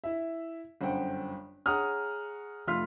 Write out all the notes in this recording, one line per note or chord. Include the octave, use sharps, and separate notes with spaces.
E4 E5
G1 F#2 C5 F#5 G5
G#4 C#5 F#5 A#5 D#6 F6
F1 A3 F4 C6 F6 B6